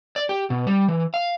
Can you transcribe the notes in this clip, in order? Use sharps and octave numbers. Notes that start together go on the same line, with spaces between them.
D5
G4
B2
G3
E3
F5